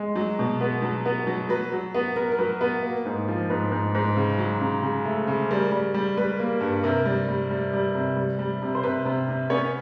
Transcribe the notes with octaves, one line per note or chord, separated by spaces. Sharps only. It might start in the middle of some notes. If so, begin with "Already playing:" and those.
Already playing: G#3
F#3
B2
B3
F#3
B3
F#3
F#3 B4
F#3
B3
B3 A#4
A#4
F#3 B4
B3 B4
A#3
G#2
F3
G#2 B4
G#2
G#2
C#3
F#3
C#3
C#3
A3
C#3
G3 A#4
G3
G3
G3 B4
A#3
G2
C3 A#4
G3
G3
G3
G3
C3
G3
G3
C3
C5
C3 B4
C3
C3
B3 C#4 C#5